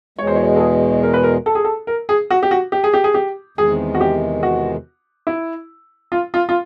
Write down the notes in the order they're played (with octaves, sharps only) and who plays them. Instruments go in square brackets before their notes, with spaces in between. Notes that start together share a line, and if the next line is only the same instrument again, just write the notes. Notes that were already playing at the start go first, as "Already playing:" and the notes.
[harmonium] E2 B2 G#3 [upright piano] C#5
[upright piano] C5
C#5
A4
G#4
A#4
B4
A#4
A4
G#4
A4
A#4
G#4
F#4
G4
F#4
G4
G#4
G4
G#4
G4
[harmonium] E2 C3 D#3 G#3 [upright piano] G#4
[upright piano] F#4
G4
F#4
E4
F4
F4
F4